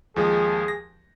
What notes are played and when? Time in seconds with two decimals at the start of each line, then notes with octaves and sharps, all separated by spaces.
0.16 D#2 F3 G#3 G#4
0.68 A#6